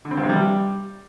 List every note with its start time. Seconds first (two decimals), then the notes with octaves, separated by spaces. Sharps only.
0.05 D3
0.11 C4
0.17 G2
0.23 C3
0.29 G3